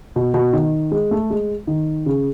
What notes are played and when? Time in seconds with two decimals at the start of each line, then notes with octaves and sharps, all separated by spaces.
0.16 B2
0.34 B2
0.53 D#3
0.91 G#3
1.11 A3
1.30 G#3
1.67 D#3
2.06 C#3